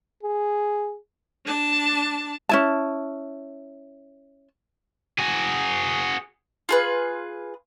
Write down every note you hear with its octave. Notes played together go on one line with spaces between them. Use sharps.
G#4
D4 A5
C#4 E4 A5
F#4 G#4
F4 G#4 B4